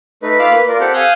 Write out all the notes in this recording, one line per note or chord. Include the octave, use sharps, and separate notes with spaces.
A3 D#4 B4
F4 F5 B5 D6 E6
A#3 B4
F4 A#4 D5
C4 G4 A4 F#5
F5 G#5 D#6 E6 F#6 G6